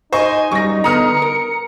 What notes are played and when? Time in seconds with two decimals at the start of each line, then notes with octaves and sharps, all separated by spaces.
0.12 D#4 C5 D#5 G#5 C#6
0.51 F#2 G3 C#6 A#6
0.84 D3 B3 A#5 D#6 F6 C#7
1.22 A#4